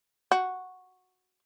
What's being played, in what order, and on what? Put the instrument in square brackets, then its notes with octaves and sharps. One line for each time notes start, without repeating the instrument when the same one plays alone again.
[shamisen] F#4